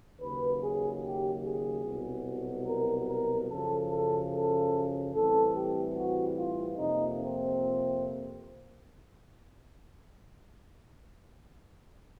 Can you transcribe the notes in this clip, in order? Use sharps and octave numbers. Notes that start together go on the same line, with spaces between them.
D#2 C#3 F#3 B4
G#4
G4
G#4
C2 B2 F#3
A#4
A#4
F#2 C#3 F3 A4
A4
A4
A2 E3 G3 C4 A4
G4
F#4
F4
F2 C3 F3 A#3 D#4
C4